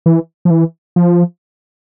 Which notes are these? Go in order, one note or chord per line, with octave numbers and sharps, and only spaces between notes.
E3
F3
E3
F3